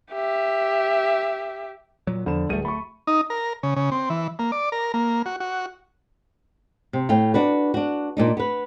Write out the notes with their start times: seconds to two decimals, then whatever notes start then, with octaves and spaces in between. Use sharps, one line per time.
0.13 G4 E5
2.07 A#2 F#3
2.26 E2 D3 F3 B5 E7
2.49 D1 G3 A3 G#4 D#7
2.65 A3 B5 C#6
3.07 D#4
3.30 A#4
3.63 C#3
3.76 C#3
3.92 C4
4.10 E3
4.39 A#3
4.52 D5
4.72 A#4
4.94 A#3
5.26 F#4
5.40 F#4
6.93 C3
7.09 A2 F5 G5
7.34 D4 F#4 B4
7.74 D4 F#4
8.17 A#2 D4 D#4
8.37 B3 B4